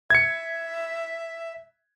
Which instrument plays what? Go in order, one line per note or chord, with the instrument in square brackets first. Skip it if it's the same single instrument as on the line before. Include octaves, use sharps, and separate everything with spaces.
[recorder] E5 [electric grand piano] G#6 C#7